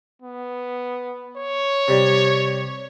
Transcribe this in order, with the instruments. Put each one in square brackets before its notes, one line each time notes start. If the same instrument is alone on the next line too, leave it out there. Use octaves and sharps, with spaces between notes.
[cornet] B3
C#5
[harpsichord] C3 G3